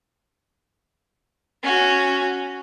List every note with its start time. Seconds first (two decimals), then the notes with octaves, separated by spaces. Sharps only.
1.63 C#4 F#4